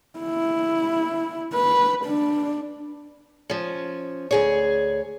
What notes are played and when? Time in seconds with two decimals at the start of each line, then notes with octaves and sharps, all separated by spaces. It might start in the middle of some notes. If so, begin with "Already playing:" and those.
0.20 E4
1.55 B4
2.05 D4
3.50 F3 C#4
4.31 D2 G#4 C#5